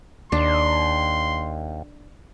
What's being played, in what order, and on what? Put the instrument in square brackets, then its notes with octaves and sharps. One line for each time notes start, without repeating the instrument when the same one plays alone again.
[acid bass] D#2 [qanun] D4 [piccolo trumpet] C6